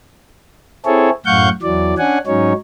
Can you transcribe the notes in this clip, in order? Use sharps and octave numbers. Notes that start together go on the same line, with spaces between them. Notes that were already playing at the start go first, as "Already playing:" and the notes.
C4 E4 G#4 A4 C#5
F#2 A2 F5 F#5 C#6 G6
E2 E3 F#3 D5
C#4 D4 F#5 G#5
G#2 F#3 C#4 D#4 C#5